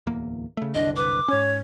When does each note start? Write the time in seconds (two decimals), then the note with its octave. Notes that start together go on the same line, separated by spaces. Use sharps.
0.07 D1 E2 A#3
0.57 C#3 A3
0.74 F#1 C2 D3 D4 D#5
0.96 B4 D6
1.28 G#2 C#4 C#5